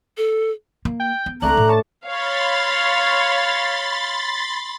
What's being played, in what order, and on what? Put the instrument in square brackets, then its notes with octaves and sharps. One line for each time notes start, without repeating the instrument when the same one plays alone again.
[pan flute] A4
[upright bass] A#3
[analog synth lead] G5
[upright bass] B3
[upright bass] C#2 C4 [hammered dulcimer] A3 D4 [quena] A#5 [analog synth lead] F#6
[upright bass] A2
[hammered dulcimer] C#5 [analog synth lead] A5
[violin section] C#5 F5 [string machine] B5 C6 A6